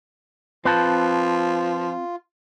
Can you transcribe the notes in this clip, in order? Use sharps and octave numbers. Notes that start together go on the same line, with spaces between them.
F3 C4 F4 B4 A5 G6